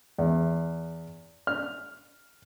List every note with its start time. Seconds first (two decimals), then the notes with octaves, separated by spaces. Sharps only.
0.18 E2
1.47 F6